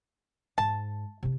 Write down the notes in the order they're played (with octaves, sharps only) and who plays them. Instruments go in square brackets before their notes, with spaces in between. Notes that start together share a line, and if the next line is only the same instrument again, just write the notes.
[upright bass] G#2 [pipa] A5
[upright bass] C3 E4